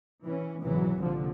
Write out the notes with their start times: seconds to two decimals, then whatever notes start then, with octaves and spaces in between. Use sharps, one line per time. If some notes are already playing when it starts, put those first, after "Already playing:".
0.24 E3 C#4
0.61 G#1 C#2 B2 E3 F#3
0.98 C2 A#2 D3 F3